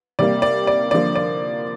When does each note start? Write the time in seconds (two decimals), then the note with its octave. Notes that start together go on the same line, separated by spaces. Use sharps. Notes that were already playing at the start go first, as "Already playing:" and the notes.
0.19 C3 G3 A#3 D5
0.42 D5
0.67 D5
0.91 D3 F3 A#3 D5
1.15 D5